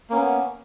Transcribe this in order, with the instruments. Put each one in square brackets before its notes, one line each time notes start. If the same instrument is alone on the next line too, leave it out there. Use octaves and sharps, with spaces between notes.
[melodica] A#3
C#4
B3